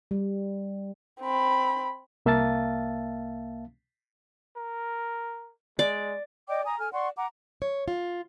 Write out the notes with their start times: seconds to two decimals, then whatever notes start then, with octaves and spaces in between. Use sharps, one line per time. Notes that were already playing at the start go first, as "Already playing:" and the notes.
0.11 G3
1.21 C4 B5
2.26 C2 A#3 E5 F5 A5 A6
4.56 A#4
5.79 G#3 D5
6.48 D5 D#5 G5 D6
6.65 G#5 A#5 D#6
6.78 A4 G#5 F6
6.93 D5 F#5 C6 C#6
7.16 F#5 A#5 D6
7.62 C#5
7.88 F4